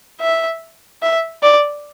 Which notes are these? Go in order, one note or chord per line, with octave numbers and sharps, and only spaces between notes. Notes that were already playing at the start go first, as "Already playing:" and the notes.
E5
E5
D5